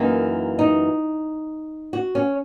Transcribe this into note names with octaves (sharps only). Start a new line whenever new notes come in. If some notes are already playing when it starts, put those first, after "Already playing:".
Already playing: F#2 E3 A#3 D#4
D#4
F#4
C#4